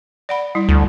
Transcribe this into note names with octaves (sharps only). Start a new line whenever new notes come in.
D5 F#5 B5
G3 E4
D2